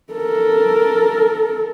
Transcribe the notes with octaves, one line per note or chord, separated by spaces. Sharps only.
A4 A#4